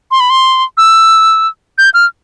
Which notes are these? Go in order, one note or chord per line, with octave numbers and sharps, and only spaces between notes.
C6
B5
C6
E6
G6
F6